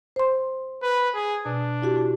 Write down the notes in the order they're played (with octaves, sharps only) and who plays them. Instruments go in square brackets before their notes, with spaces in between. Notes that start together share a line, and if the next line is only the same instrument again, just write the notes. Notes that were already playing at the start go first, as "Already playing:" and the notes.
[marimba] C5 C6
[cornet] B4
G#4
[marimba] B2 [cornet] D4
[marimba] E4 F#4 G4